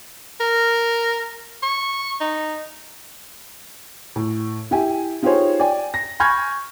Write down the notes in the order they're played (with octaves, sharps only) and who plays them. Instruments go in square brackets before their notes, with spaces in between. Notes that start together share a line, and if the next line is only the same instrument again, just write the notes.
[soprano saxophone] A#4
C#6
D#4
[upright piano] A2
E4 G4 G#5
D#4 F4 G4 G#4 C5 C#5
D5 G5 G#5
A#6
G#5 B5 C#6 F6 G6 G#6